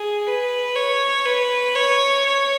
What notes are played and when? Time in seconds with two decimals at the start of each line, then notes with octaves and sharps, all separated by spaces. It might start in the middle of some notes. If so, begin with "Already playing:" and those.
Already playing: G#4
0.27 B4
0.75 C#5
1.26 B4
1.75 C#5
2.25 C#5